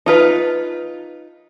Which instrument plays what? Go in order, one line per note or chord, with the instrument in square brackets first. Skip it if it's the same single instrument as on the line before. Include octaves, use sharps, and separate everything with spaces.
[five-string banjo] D#4 F4 B4